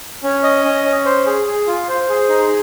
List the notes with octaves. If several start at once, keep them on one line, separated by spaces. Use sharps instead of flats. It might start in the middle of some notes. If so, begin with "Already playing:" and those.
C#4
D#5
C#4
C#4
C5
G#4
G#4
F4
C5
G#4
D#4